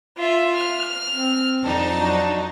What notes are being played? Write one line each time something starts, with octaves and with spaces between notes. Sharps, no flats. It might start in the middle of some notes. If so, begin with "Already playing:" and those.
F4 E5
F6
C4
F2 D4 D#4 A5
F#3